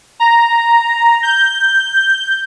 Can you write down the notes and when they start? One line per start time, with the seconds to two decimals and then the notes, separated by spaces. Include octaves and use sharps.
0.20 A#5
1.23 G6